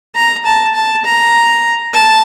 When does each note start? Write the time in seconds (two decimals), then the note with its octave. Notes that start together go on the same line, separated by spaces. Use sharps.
0.16 A#5
0.45 A5
0.75 A5
1.05 A#5
1.93 A5